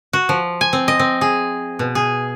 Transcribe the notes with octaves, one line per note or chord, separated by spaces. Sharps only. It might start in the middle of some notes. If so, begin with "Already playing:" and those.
F#4
F3
G#5
C4
D#5
C4
G#4
B2
G#4